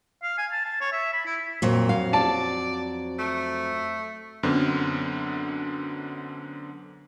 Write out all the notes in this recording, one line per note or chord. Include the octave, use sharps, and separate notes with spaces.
F5
G#5
A5
A5
C#5
E5
B5
E4
F2 A#2 F#3
F5
D5 A5
A3
F#2 D3 B3 C4